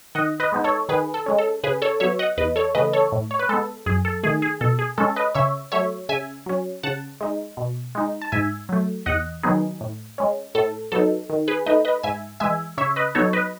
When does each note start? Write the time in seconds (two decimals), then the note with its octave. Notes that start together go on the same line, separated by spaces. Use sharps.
0.15 D#3 D#5 F#5
0.40 B4 D#5
0.52 G#3 B3 D#4
0.64 A4 C#5
0.89 D#3 G#4 B4
1.14 A4
1.26 G#3 C#4
1.39 A4
1.64 C#3 G#4 B4
1.82 A4 C#5
2.00 F#3 B3 C#5 E5
2.19 D#5 F#5
2.37 E2 B4 D#5
2.56 A4 C#5
2.75 C#3 E3 A3 B4 D#5
2.93 A4 C#5
3.12 A2
3.31 C#5
3.39 B4
3.49 G#3 B3 A4
3.86 F#2 G#4
4.05 A4
4.23 D#3 A3 G#4
4.42 G#4
4.61 B2 A4
4.79 G#4
4.98 G#3 C#4 A4
5.16 B4 D#5
5.35 C#3 C#5 E5
5.72 F#3 A3 C#5 E5
6.09 C#3 E5 G#5
6.46 F#3 C#4
6.83 C#3 F#5 A5
7.21 G#3 D#4
7.57 B2
7.95 G#3 D#4
8.22 A5
8.32 G#2 E5 G#5
8.69 F#3 A3
9.06 E2 D#5 F#5
9.43 D#3 F#3 B3 D#4 G#4
9.81 A2
10.18 G#3 C#4
10.55 A2 A4
10.92 F#3 B3 D#4 A4
11.30 D#3
11.48 G#4 B4
11.66 A3 D#4 B4 D#5
11.85 B4 D#5
12.03 G#2 E5 G#5
12.40 E3 G#3 E5 G#5
12.77 C#3 C#5 E5
12.96 B4 D#5
13.15 F#3 B3 D#4 A4 C#5
13.33 B4 D#5